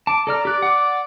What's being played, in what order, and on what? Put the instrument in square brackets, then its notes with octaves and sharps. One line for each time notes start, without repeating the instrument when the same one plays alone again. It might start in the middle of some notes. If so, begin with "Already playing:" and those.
[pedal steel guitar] A5 [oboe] D6
[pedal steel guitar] A4 D5 F6 [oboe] A#5
[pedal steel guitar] G4 F#6 [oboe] D5
[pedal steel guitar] F#5 D6